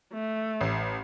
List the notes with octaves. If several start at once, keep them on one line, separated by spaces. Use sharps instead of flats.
A3
A1